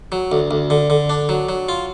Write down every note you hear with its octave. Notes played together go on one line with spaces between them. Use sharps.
F#3
D2
D2
D3
D3
D4
F#3
F#3
F4